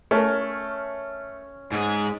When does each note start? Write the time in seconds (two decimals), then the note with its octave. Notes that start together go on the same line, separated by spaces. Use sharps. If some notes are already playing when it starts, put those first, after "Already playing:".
0.11 A3 C#4 A#4
1.72 G#2 G#4